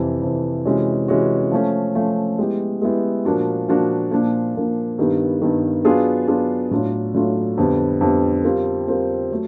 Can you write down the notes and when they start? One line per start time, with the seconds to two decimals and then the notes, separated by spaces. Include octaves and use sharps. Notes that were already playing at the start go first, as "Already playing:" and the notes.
Already playing: F2 C3 E3
0.22 F2 C3 E3
0.65 C3 E3 G#3 C#4 F#4
1.08 C3 E3 G#3 C#4 F#4
1.52 F3 A3 C#4
1.95 F3 A3 C#4
2.38 G#3 B3 E4 G4
2.82 G#3 B3 E4 G4
3.25 A#2 F3 A#3 D4 F#4
3.69 A#2 F3 A#3 D4 F#4
4.11 A#2 F3 A#3 D4
4.55 A#2 F3 A#3 D4
4.98 G2 D#3 G3 B3
5.42 G2 D#3 G3 B3
5.85 F#3 B3 D4 F4 G#4
6.28 F#3 B3 D4 F4 G#4
6.71 A2 F#3 A3 D4 F4
7.14 A2 F#3 A3 D4 F4
7.57 F2 D3 G3 B3
8.01 F2 D3 G3 B3
8.44 G3 C4 F4 A#4
8.88 G3 C4 F4 A#4
9.31 F#3 A3